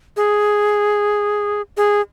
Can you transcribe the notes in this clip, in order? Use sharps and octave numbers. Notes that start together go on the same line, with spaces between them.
G#4
G#4